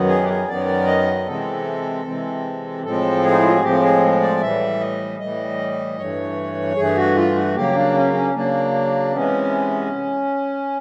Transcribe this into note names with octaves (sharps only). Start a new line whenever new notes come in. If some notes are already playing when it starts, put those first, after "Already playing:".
Already playing: F#2 D#3 F#3 B3
G#4
G4
G#4
F#2 D#3 F#3 B3 D5
D#5
C3 E3 G#3 C4 A4
C3 E3 G#3 C4
A2 F3 G#3 C4 A4
G#4
D#4
E4
F4
F#4
A2 F3 G#3 C4 G4
G#4
D5
A2 E3 G3 E5
D#5
A2 E3 G3 D#5
G2 E3 A3 C#5
G2 E3 A3 G#4
F#4
F4
F#4
C#3 F#3 A#3 G4
D4
C#4
C#4
C#3 F#3 A#3 D4
C3 E3 G#3 B3 C#4